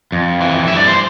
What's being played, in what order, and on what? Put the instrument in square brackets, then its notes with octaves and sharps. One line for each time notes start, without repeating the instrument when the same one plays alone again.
[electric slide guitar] F2
E3
G2 E5
D5
C5